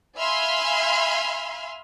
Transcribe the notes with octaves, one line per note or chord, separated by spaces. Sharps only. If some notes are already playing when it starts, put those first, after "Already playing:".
E5 F5 G#5 B5 C6 F6